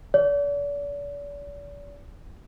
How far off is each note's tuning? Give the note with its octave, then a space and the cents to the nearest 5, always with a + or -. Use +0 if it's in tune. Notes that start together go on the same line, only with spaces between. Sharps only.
D5 -40